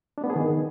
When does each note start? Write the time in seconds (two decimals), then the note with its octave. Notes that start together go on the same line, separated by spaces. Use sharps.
0.18 D4
0.24 B3
0.30 G#4
0.36 D#3